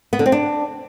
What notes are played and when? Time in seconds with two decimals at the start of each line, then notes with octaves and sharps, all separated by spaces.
0.13 B3
0.19 D3
0.26 C4
0.32 D4